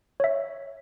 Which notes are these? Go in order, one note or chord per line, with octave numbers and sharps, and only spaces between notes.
C#5 E5